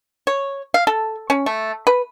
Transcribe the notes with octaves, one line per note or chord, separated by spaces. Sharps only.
C#5
F5
A4
C#4
A3
B4